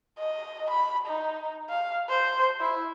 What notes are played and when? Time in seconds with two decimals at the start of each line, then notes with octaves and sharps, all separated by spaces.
0.19 D#5
0.70 B5
1.06 D#4
1.70 F5
2.09 C5
2.61 E4